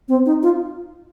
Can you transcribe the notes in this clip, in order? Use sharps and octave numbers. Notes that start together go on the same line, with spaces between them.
C4
D#4
F4